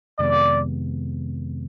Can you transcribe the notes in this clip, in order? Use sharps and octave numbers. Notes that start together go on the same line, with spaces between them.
F2 C3 D#3 G#3 B3 D5